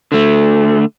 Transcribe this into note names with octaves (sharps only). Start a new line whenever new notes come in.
D3 A3